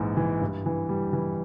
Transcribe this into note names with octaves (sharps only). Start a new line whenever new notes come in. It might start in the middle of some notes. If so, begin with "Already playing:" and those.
Already playing: A#1 G#2 E3
E3
G2
E3
G3
E3